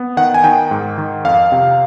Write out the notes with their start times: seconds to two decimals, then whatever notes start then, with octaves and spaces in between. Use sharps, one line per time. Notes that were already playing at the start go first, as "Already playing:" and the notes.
Already playing: B3
0.17 D#3 F#5
0.34 G#5
0.44 D#3 G5
0.71 G#2
0.98 D#3
1.25 F2 F5
1.52 C3